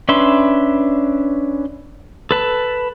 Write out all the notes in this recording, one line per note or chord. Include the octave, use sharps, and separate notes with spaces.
C#4 D4 B4 E5 C6
A4 B4 A5